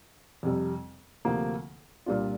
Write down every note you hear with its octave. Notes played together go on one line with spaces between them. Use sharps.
F2 C3 G3
D2 C3 F3 A#3
C2 A#2 G3 D4 F4